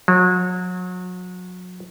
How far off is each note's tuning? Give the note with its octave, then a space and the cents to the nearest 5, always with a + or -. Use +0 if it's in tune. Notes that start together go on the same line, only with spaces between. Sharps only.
F#3 -35